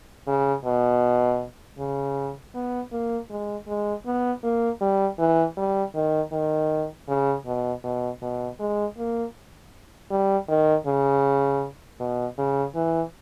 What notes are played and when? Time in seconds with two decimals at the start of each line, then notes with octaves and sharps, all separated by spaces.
0.27 C#3
0.65 B2
1.78 C#3
2.54 B3
2.92 A#3
3.30 G#3
3.68 G#3
4.06 B3
4.43 A#3
4.81 G3
5.19 E3
5.57 G3
5.95 D#3
6.32 D#3
7.08 C#3
7.46 B2
7.84 B2
8.22 B2
8.59 G#3
8.97 A#3
10.11 G3
10.49 D#3
10.86 C#3
12.00 B2
12.38 C#3
12.75 E3